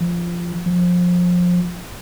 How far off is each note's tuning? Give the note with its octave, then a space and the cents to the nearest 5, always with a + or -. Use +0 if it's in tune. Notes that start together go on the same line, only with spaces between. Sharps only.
F3 -15
F3 +25